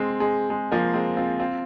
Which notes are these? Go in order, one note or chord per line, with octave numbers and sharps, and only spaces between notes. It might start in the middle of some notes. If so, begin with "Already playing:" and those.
Already playing: G#3 C4
G#3
G#3
F3 A#3
G#3 C4
C4 F4
C4 F4